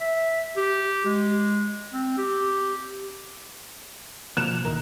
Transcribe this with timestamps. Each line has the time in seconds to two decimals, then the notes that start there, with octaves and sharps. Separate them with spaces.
0.01 E5
0.57 G4
1.05 G#3
1.93 C4
2.18 G4
4.37 B2 F3 A#3 F#6 E7 F7
4.65 D2 A2 D#3 A#4